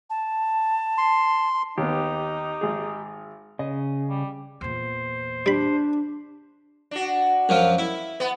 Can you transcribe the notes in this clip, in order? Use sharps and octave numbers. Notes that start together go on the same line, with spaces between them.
A5
C6
D#2 B3 D#4 G4
G#1 G#4
C#3 D#5
G3
E2 A#2 C5
G3 D4 B5
D4 F#4
F#2 F3 F4
E4
B3